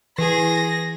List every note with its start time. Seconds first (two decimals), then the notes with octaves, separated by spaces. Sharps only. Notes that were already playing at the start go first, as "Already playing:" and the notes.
0.18 E3 G#4 B4 A#6